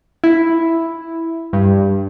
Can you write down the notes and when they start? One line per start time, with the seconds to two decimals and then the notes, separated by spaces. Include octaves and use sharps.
0.24 E4
1.53 G2